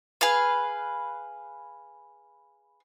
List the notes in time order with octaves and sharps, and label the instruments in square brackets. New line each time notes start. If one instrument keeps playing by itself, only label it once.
[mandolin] G#4 B4 F5